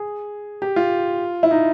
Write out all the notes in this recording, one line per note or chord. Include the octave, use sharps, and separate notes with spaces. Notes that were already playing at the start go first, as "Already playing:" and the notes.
Already playing: G#4
G4
F4
E4
D#4